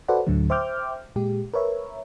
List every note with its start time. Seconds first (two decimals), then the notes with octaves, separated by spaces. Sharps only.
0.08 F#4 A4 B4 C5 D5 F#5
0.27 D2 A2 D3 F#3 A3
0.50 C5 E5 G5 D6 F6 G6
1.16 A#2 G#3 G4
1.54 A#4 B4 C#5 E5